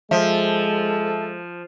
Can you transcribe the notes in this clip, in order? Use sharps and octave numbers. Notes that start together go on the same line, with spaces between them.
F3 G#3 A4 E5